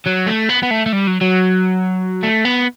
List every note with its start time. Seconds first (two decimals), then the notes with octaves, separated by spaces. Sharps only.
0.06 F#3
0.27 A3
0.49 B3
0.63 B3
0.71 A3
0.86 A3
0.93 G3
1.07 F#3
1.22 F#3
2.23 A3
2.45 B3